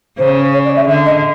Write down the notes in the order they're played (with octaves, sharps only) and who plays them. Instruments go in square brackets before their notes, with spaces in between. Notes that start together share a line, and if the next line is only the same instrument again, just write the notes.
[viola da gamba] C#3 [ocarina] C5
[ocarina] C#5
D5
E5
[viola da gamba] D3 [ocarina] E5
[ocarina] D#5